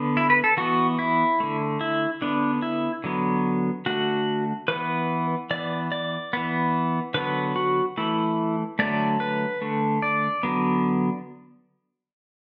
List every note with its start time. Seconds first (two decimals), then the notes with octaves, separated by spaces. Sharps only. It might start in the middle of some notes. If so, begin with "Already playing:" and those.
Already playing: D3 B3
0.17 E4
0.30 B4
0.44 A4
0.57 E3 B3 F#4
0.99 E4
1.40 D3 A3
1.81 E4
2.21 D3 B3 D4
2.62 E4
3.04 D3 F#3 B3
3.86 D3 A3 F#4
4.68 E3 B3 B4
5.51 E3 B3 D5
5.92 D5
6.33 E3 B3
7.14 D3 F#3 B3 B4
7.56 F#4
7.97 E3 A3 E4
8.79 D3 F#3 A3 D5
9.20 B4
9.62 D3 A3
10.02 D5
10.43 D3 F#3 B3